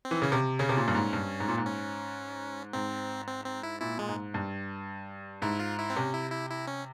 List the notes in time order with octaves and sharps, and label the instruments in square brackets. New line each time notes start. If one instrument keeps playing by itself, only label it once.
[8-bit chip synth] C4
[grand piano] E3
[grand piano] C#3 [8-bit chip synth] C#4
[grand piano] C3
[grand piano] C#3 [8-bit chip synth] C#4
[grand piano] C3
A#2
G2
G#2
G2
G#2
A#2
G#2
[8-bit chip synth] C#4
[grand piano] G#2 [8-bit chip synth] C4
[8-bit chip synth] C4
C4
E4
[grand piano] A#2 [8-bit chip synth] E4
[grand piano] A#2 [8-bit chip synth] G#3
[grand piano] G#2
G2
[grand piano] G#2 [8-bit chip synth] E4
[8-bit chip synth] F4
E4
C4
[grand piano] C3 [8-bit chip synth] C#4
[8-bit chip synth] E4
E4
E4
C#4